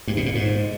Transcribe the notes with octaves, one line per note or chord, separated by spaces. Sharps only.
G2
B2
A#2
G#2